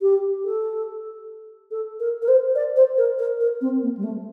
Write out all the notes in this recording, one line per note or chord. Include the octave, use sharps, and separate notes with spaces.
G4
A4
A4
A#4
A#4
C5
D5
C5
A#4
A#4
A#4
C4
A#3
G3
A3